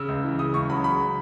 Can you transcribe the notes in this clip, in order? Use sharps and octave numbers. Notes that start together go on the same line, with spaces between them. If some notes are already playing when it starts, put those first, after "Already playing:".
Already playing: C#3 E6
C#2
E3
C#3 D#6
C#2 C#6
F#3 B5
C#3 B5